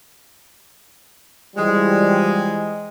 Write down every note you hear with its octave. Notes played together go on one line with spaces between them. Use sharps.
E3 F3 G3 G#3